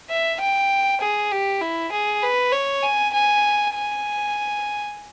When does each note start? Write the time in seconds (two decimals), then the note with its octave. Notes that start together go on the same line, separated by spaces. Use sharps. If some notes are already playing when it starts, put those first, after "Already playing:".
0.10 E5
0.40 G5
1.01 G#4
1.32 G4
1.61 E4
1.92 G#4
2.23 B4
2.52 C#5
2.83 G#5
3.13 G#5
3.75 G#5